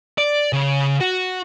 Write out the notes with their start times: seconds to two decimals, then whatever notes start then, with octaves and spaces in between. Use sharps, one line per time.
0.18 D5
0.53 C#3
1.00 F#4